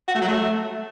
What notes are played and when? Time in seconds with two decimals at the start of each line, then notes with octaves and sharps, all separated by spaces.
0.08 F#4
0.15 A3
0.21 F#3
0.28 A3